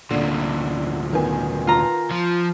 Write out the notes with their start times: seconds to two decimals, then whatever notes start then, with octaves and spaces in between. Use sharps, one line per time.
0.11 D2 A#2 D3
1.13 D#3 B3 G#5
1.67 F4 A#5
2.11 F3